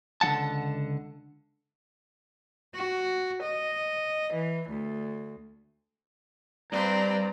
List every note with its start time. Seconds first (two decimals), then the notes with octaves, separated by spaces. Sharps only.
0.21 C#2 D3 F3 F#5 A5
2.76 F#4
3.43 D#5
4.34 E3
4.70 D2
6.72 G2 C4 B4 C5 D5 A#5